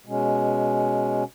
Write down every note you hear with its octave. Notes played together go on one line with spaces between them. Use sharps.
B2 G#3 C#4